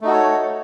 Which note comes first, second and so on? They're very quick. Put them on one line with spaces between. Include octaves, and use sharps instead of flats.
A3 D#4 F#4 A4 C#5